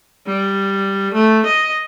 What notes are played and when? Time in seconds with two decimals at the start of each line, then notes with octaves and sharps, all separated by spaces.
0.27 G3
1.14 A3
1.46 D#5